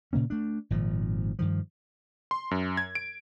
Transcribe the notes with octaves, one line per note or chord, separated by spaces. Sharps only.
A#2 C#3 A#3 C#4
A3 D4
G#1 A#2 F3
G2 D#3 F3
C6
F#2
G#6
D7